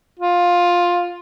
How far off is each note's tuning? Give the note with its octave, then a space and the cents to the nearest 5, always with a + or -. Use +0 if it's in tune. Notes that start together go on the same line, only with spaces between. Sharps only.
F4 +10